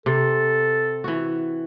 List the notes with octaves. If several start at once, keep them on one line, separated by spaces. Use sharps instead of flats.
C3 A4
E3 F#4